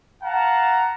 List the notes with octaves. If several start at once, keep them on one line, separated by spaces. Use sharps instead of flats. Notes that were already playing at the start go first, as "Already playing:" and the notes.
F5 F#5 A5 A#5